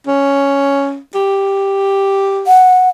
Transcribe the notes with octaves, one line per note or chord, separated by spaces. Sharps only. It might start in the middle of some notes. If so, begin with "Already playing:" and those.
C#4
G4
F#5